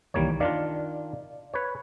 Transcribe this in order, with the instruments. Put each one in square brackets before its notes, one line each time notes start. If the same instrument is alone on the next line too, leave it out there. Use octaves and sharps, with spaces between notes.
[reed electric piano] C2 D#3 E3 [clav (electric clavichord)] G3 A#3 C#5
[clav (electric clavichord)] D#3 D4 F4 [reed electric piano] D5 F5
[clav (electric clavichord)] B4 C#5